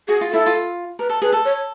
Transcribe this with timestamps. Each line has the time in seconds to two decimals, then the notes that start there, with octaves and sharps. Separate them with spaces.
0.08 F#4 G#4
0.21 F4
0.31 E4 A4
0.46 F4
0.99 A#4 B4
1.09 A4
1.22 G#4 B4
1.33 A4
1.45 C#5